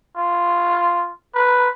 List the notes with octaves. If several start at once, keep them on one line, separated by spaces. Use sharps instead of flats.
F4
B4